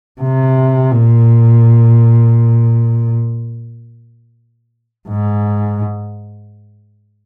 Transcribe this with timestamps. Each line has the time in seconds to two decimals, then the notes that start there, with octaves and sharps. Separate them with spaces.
0.21 C3
0.92 A#2
5.09 G#2